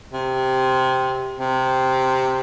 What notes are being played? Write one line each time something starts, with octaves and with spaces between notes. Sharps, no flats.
C3
C3